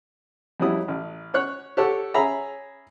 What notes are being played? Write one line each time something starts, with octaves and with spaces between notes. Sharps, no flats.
F2 F#3 G3 C#4 E4 D#6
A1
C#4 C#5 F#6
G4 A4 C#5 F#5 A5
C#4 G#4 E5 A#5 B5